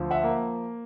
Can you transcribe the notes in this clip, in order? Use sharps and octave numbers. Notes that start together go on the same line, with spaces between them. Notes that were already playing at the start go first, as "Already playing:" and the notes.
Already playing: D2 F3
E5 F#5
A#3